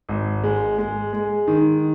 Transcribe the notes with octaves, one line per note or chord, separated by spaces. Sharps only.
G#1
G#3
G#3
G#3
D#3